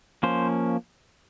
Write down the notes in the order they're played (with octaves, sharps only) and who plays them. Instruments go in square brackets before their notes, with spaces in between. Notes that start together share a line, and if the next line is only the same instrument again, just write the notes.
[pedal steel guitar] F3 A#3 C#4 C5